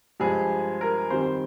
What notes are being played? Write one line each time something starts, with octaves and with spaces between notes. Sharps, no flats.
G2 F3 G#3 G#4
A#4
F2 D#3 G3 C5